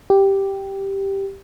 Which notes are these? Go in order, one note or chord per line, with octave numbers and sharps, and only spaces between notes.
G4